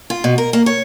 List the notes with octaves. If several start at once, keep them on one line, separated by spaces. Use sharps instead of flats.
F4
B2
A#4
A#3
C#5